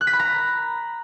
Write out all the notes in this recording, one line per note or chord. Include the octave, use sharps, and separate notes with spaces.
F#6
B6
B5
A#5